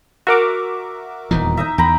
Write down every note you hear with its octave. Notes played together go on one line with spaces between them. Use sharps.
F#4 A#4 E5 D6
D#1 E2 E3 D#4
D#4 D#5 E5
E2 G5 A#5 B5